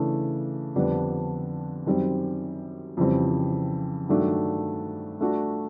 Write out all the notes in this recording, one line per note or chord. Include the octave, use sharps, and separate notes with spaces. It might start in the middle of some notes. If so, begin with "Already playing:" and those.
Already playing: C#3 E3 A3 D4
F2 D3 G3 B3 D4
F#2 D#3 G3 C4
F2 C#3 E3 G3 C4
G2 D#3 F#3 A3 D4
A3 D4 F#4